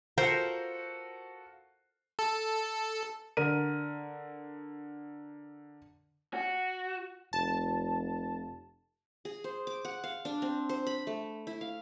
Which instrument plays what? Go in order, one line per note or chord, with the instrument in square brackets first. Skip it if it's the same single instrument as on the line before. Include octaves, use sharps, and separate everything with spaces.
[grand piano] F4 F#4 A4 [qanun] A#4 C5 G5
[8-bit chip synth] A4
[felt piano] D3 A#4 D#7
[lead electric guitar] F#4
[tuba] F1 [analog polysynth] A5
[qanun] G#4
C5
D6
F#5
F5
D4
C4
C5
B5
A3
E4
F5